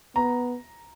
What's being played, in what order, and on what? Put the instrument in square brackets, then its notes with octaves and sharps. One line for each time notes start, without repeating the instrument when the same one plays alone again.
[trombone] B3 [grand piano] A#5